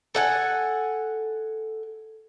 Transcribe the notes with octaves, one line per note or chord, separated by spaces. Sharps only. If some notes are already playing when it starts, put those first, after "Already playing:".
A4 F#5 G#5